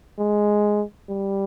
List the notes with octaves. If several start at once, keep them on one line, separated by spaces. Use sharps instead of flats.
G#3
G3